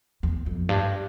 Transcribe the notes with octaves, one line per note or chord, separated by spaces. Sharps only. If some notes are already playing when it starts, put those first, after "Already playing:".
E2
F2
G2